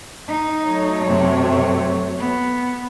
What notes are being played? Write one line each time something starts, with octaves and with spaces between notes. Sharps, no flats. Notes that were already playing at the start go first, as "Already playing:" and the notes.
D#4
F#3 A3 C#5
F#2 C3
B3